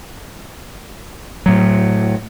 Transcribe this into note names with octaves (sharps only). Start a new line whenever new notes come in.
A2 F#3